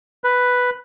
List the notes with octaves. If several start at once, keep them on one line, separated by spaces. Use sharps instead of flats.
B4